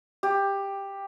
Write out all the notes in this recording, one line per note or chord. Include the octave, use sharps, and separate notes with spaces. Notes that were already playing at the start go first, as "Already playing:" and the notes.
G4